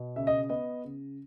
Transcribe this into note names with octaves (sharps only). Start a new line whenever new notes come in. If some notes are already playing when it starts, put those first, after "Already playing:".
Already playing: B2
C#3 E5
D#5
B3 D#5
C#3